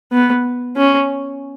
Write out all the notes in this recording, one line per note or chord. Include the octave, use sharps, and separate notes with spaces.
B3
C#4